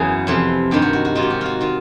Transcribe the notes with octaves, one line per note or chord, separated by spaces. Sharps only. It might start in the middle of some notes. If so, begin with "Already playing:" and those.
Already playing: F#2 C#3 E3 B3 F#4 G#4
F2 C3 E3
G2 D#3 G4
F#4
F#4
F#4
G#2 D#3 F4
G4
F#4
F4 F#4
D#3 F4